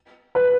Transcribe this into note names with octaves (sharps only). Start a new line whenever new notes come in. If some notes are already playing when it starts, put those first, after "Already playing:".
B4